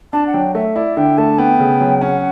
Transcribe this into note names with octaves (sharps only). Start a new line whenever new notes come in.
D4 A5
F#5
F#3 G5
A3 E5
E4 D5
D3 G5
A3 A5
B3 G5
C#3
F#3
C#4 F#5